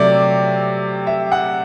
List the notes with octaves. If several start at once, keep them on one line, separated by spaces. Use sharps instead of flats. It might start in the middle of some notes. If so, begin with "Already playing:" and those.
Already playing: C3 F#3 A3 D5 E5
E5
F#5